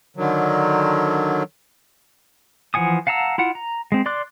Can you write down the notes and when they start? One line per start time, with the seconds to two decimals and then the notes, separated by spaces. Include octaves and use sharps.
0.17 D3 D#3 F#3
2.74 E3 F3 F#5 G#5 D#6
3.07 F5 F#5 A5 A#5 E6
3.38 E4 F4 F#5
3.55 A#5
3.92 G#3 C4
4.06 D5 C6 D6 F#6